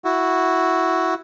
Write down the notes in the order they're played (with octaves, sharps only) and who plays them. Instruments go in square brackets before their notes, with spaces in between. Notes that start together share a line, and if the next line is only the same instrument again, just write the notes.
[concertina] E4 F#4